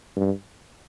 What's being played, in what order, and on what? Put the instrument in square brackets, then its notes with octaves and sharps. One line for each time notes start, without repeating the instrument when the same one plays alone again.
[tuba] G2